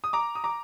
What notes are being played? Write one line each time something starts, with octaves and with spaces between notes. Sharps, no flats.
D#6
A#5 D6
D#6
A#5 D6